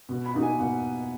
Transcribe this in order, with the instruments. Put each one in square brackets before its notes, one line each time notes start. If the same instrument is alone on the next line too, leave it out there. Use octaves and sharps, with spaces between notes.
[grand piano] B2
[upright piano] B5
[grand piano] A#3 D#4 F#4
[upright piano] G#5
[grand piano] B2 [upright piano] F#5